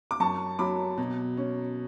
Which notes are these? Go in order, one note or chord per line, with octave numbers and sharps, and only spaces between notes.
D6
F#2 A5 C#6
F#3 B5 D6
B2
C#4